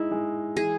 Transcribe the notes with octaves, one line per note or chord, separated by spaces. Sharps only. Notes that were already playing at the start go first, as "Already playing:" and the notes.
Already playing: G#3 D#4 E4
G#3
E3 G#4